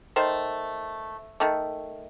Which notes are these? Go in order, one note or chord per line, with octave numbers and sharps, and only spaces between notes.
D#3 A3 C5
D#3 A3